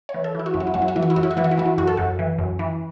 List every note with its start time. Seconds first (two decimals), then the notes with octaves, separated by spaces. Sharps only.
0.09 C#5
0.14 E3
0.24 A4
0.35 E3 E4
0.46 F#4
0.54 F#2 E4
0.60 F#4
0.67 E4
0.74 F#2 F#4
0.82 E4
0.88 F#4
0.96 E3 E4
1.03 F#4
1.10 E4
1.16 F#2 F#4
1.23 E4
1.31 F#4
1.37 E3 E4
1.44 F#4
1.51 E4
1.58 E3 F#4
1.66 E4
1.78 F#2 F#4
1.87 A4
1.97 F#2 F#4
2.19 E3
2.38 F#2
2.59 E3